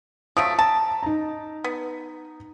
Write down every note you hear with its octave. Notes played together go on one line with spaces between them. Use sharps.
F3 F#3 A3 D#6 D7
A5 A#5
D#4 A#5
B3